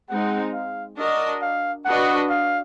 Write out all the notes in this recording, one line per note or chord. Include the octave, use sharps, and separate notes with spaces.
G#3 C4 D#4 F#5
F5
D4 F#4 A#4 D#5
F5
D4 F#4 B4 D#5 F#5
F5